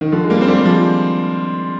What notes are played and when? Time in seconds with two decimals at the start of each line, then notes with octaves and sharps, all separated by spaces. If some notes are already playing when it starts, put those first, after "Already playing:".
0.01 D#3
0.12 D3 F3
0.24 G#3
0.30 G3 A#3
0.41 C4
0.48 G3 A#3
0.58 G3
0.65 F3 G#3